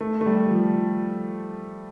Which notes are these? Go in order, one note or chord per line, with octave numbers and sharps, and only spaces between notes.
A3
A3
G3
F3